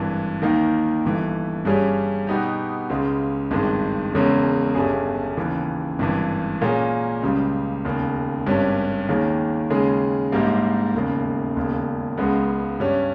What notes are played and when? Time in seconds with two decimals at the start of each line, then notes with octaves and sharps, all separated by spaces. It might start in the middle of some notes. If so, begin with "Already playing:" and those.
Already playing: G#1 G2 E3
0.42 D#2 D#3 A#3 D#4
1.04 G1 G2 E3
1.65 G2 G3 C#4 G#4
2.27 B2 G3 B3 D#4 G4
2.89 C#2 C#3 G#3
3.51 G#1 G2 D#3 G#3
4.13 E1 E2 C#3 G#3 C#4
4.75 G1 G2 G3 C#4 G#4
5.37 D#2 C#3 E3
5.99 G#1 G2 E3
6.62 A#2 A#3 C#4 G#4
7.22 C#2 C#3 G3
7.85 E1 D#2 C#3
8.46 G#1 G2 G3 C#4
9.09 D#2 D#3 A#3 C#4 G#4
9.70 D#2 C#3 G#3 C#4 G#4
10.32 A#1 G#2 G3 A#3
10.95 E1 D#2 C#3
11.56 E1 D#2 C#3
12.17 C#2 C#3 G#3 B3
12.80 G2 G3 C#4